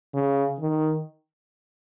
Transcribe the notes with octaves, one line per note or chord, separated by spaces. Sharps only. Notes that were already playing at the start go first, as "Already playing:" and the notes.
C#3
D#3